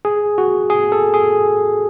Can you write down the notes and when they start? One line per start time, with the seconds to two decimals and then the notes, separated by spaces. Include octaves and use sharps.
0.05 G#4
0.38 F#4
0.70 G#4
0.92 A4
1.14 G#4